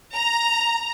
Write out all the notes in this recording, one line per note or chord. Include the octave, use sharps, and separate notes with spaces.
A#5